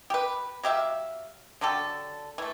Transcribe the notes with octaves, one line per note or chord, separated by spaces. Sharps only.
G4 B4
F#3 G4 E5 F5
D3 F#3 G4 A4
E3 A3